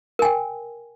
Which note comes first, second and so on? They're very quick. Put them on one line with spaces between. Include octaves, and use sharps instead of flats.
A#4 G#5 G5